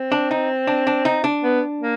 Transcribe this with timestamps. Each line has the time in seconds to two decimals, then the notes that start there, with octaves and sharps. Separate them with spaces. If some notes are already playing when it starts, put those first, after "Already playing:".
Already playing: C4
0.12 D4
0.31 D#4
0.67 D4
0.87 D4
1.05 D#4
1.24 D4
1.43 B3
1.81 A#3